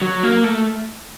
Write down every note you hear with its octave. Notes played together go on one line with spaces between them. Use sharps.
F#3
A#3
A3